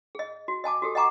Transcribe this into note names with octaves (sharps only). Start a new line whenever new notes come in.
G#4 D#5
F#4
D#5 G#5 A5 D6
F#4 G4 A4
D#5 F#5 G#5 A#5 C#6 D6